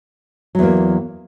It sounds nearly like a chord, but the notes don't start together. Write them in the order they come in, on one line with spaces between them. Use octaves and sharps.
F#3 E2 A#3